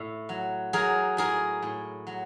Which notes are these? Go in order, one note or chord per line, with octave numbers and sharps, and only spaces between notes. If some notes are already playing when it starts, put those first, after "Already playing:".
Already playing: A2
F#3
F#3 G#4 A#4
A2 G#4 A#4
A2
F#3